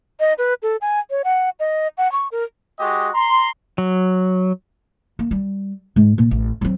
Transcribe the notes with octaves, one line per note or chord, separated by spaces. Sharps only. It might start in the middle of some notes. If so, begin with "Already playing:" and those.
D#5
B4
A4
G#5
C#5
F#5
D#5
F#5
C#6
A#4
G#3 F#4 G4 D#5
A#5 C6
F#3
A#3
G3
G#2
A#2
A1
F#3 C4